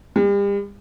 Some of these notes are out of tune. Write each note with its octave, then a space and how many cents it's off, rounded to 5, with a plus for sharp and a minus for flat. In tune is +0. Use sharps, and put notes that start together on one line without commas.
G3 +40